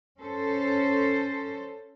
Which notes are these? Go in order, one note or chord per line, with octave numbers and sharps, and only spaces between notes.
C#4 A4 C5